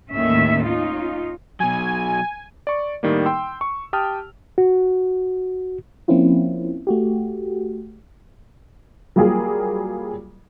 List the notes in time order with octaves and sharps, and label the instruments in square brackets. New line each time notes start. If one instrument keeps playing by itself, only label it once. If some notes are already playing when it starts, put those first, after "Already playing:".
[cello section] D#2 A2 D#3 C#4 E5
C#4 D#4 F4
[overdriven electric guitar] B2 F#3 [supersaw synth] G#5
[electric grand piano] D5 C#6
A2 D#3 G3 A#3
G5 C6 E6
C#6
G4 G5 A5 D#6 F6
[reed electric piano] F#4
[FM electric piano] F3 A#3 C4 C#4 E4 F4
A3 F#4 G4
[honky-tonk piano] F#3 G3 A#3 F4 G#4 A#4